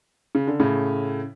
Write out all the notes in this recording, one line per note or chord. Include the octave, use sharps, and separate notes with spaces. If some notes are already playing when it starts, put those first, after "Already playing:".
C#3
D3
A2 C#3